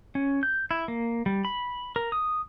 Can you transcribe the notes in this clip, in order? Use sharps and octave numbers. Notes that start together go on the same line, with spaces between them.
C#4
G6
E4
A#3
G3
B5
A#4
D#6